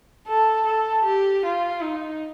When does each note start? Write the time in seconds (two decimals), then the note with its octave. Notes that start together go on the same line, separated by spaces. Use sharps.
0.27 A4
0.66 A4
1.05 G4
1.45 F4
1.83 D#4